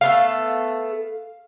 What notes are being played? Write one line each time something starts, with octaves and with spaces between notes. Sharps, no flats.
A3 B3 A4 F5